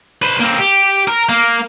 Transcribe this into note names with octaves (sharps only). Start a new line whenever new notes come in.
B4 C5
A#3 C4
G4
A#4
A#3